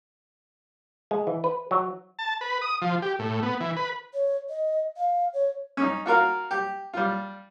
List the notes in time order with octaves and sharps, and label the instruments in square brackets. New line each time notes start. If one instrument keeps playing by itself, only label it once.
[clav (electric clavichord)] G#3
E3
B4
F#3
[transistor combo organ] A5
B4
D#6
F3
G4
A2
B3
E3
B4
[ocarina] C#5
D#5
F5
C#5
[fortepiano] C#4 D#4
F4 F#4 A#4 F5
G4
G3 F4